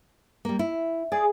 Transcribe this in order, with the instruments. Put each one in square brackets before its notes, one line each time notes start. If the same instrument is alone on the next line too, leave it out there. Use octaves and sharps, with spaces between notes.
[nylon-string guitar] G3 A#3
E4
[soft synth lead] G#4 [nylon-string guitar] D5